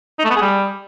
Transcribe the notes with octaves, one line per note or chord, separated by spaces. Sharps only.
D#4
A3
B3
G#4
G3